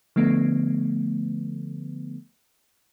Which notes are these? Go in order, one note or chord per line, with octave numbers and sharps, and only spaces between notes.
D3 F3 A3 B3